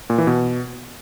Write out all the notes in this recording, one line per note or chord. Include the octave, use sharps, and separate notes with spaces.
A#2
E3
B2